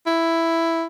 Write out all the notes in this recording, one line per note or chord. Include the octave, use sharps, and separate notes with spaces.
E4